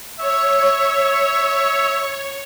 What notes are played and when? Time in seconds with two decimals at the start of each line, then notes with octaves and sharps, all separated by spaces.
0.19 C#5 E5